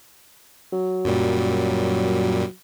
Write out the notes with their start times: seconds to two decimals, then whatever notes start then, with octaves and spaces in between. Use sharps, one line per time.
0.73 F#3
1.05 F#2 A#2 G3